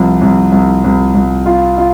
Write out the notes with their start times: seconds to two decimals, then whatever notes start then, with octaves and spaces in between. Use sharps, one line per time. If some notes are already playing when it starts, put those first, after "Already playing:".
Already playing: C2 F3
0.21 C2
0.52 C2
0.84 C2
1.15 C2
1.46 F4
1.78 F4